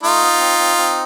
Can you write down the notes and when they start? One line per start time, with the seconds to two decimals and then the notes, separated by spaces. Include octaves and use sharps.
0.02 A3 D#4 F4
0.22 B3
0.33 B3
0.40 C4
0.59 C4
0.77 C4